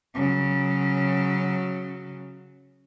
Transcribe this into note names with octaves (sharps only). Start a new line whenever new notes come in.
C#3 F#3